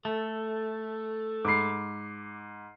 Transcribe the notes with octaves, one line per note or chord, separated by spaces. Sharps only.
A3 A4
G#2 B5 D6 C7